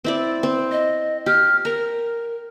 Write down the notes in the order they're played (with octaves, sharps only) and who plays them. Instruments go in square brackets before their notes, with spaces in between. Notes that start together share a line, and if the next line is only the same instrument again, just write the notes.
[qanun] C4 E4 D5
C4
[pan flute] D#5
[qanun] G4 [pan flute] F6
[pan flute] A#4 [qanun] A#5